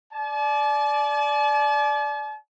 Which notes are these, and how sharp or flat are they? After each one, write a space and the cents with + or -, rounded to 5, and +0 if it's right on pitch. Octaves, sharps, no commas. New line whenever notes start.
D5 +0 A5 -45